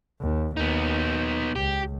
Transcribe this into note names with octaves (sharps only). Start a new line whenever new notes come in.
D#2
D#2 B3 D#4
C#2 G4